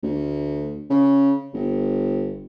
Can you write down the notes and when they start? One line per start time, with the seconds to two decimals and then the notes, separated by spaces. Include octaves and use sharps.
0.03 D2
0.90 C#3
1.54 G1